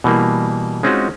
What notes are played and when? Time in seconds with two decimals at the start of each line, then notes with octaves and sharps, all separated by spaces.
0.04 B2 E3 G3 A#3
0.83 G#3 C4 C#4 D#4 F4 F#4